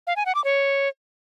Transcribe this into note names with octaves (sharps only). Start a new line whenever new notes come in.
F5
G#5
F#5
D6
C#5